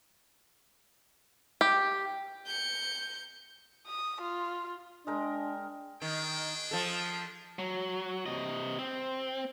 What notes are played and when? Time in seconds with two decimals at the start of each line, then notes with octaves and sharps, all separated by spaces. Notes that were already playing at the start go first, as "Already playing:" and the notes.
1.61 G4
2.46 G6 C#7
3.87 D#6
4.21 F4
5.07 G#3 D4 A#4 G5
6.02 D#3 D4 G#4 G5
6.71 F3 A4
7.59 F#3
8.26 C3 D#5
8.79 C4